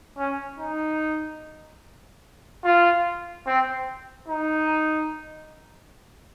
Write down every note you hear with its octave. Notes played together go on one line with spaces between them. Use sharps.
C#4
D#4
F4
C4
D#4